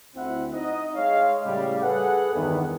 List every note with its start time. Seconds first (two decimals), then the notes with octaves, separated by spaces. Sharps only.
0.16 D2 C4 E4 E5 F#5
0.54 D#4 D#5
0.95 G#3 C#5 F5
1.45 A2 C#3 G3
1.81 G#4 A4 B4 F#5
2.33 E2 G2 D#3 B3